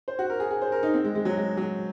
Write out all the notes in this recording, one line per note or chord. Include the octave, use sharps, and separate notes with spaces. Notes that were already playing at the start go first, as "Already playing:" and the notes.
C5
F#4
A#4
G#4
G#4
C5
A#4
D#4
C4
G#3
G#3
F#3
G#3
F#3